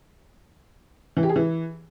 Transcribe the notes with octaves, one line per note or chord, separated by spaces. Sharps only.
E3
G4
G#4
E3